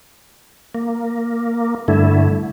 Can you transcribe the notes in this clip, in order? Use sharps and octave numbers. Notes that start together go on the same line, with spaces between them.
A#3
G2 D3 A3 E4